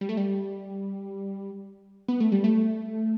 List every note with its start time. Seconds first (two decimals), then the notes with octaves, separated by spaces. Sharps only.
0.01 G3
0.09 A3
0.17 G3
2.08 B3
2.20 A3
2.32 G3
2.44 A3